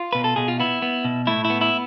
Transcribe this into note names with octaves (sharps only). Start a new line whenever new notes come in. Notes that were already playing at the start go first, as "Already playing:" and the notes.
Already playing: F4
B2 B4
A4
B2 G#4
F4
B3 E4
B3
B2
A2 E4
E4
B3
E4